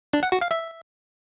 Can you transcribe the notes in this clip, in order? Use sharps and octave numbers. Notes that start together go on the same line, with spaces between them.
D4
F#5
F#4
F5
E5